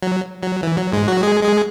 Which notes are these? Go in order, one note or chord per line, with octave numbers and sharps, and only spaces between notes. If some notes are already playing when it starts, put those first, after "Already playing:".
F#3
F#3
E3
F#3
G#2 G#3
F#3 F#4
G#3 G#4
G#3 G#4